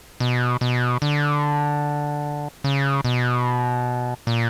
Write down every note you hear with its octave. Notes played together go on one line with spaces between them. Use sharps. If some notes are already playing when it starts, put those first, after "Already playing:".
B2
B2
D3
C#3
B2
A#2